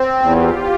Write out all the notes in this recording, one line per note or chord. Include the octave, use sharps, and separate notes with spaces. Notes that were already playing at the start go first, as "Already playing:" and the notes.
Already playing: C4
E2 F4 G4